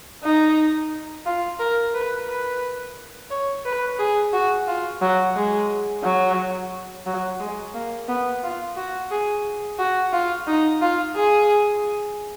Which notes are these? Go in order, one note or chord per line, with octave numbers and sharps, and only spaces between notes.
D#4
F4
A#4
B4
B4
C#5
B4
G#4
F#4
F4
F#3
G#3
F#3
F#3
G#3
A#3
B3
F4
F#4
G#4
F#4
F4
D#4
F4
G#4